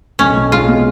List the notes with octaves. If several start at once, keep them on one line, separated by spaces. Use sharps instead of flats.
B1 C#4
B1
G#3 F4
B2